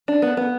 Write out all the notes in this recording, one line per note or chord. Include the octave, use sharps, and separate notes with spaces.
D4
B3
B3